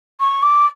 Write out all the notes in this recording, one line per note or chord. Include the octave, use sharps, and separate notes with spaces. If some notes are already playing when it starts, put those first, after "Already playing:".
C#6
D6